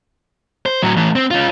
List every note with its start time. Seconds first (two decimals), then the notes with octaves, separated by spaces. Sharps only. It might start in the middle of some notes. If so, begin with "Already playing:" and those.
0.66 C5
0.83 A2 F#3
0.97 E3 A3
1.16 C4
1.31 C#4 F4